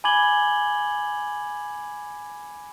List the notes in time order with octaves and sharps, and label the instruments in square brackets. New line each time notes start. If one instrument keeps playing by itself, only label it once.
[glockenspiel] G#5 B5 D6 G#6 F#7 G7